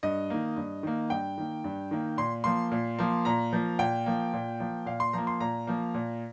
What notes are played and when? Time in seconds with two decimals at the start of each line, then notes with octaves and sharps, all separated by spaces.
0.03 G2 D#5
0.30 D#3 A#3
0.57 G2
0.83 D#3 A#3
1.10 G2 G5
1.38 D#3 A#3
1.64 G2
1.91 D#3 A#3
2.17 A#2 C6
2.44 F3 A#3 C6
2.71 A#2
2.99 F3 A#3
3.25 A#2 A#5
3.53 F3 A#3
3.79 A#2 G5
4.06 F3 A#3
4.33 A#2
4.60 F3 A#3
4.86 A#2 F5
5.00 C6
5.13 F3 A#3 A#5
5.27 C6
5.40 A#2 A#5
5.67 F3 A#3
5.94 A#2